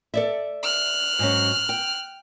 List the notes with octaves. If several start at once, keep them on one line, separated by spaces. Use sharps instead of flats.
A4 D5 E5
F6 F#6
G#2 F#3 C#4
G5